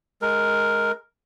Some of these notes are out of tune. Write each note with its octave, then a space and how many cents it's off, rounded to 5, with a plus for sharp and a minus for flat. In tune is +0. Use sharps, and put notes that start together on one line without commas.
G#3 +15 A#4 +0